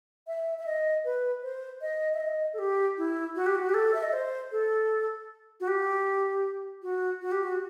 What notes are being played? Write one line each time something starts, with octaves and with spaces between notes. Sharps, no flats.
E5
E5
D#5
B4
C5
D#5
E5
D#5
A4
G4
E4
F#4
G4
F#4
G4
A4
E5
D#5
C5
A4
F#4
G4
F#4
F#4
G4
F#4